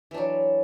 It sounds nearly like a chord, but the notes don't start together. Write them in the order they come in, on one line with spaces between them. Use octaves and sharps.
E3 D4 F#3